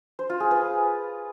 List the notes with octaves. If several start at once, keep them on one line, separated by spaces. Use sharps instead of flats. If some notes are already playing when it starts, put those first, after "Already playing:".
C5
F4
G#4
B4